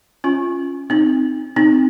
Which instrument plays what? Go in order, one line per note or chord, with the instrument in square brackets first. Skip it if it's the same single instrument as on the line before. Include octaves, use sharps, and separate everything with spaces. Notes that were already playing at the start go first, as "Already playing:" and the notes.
[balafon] C#4 F4
C4 D#4
C4 D#4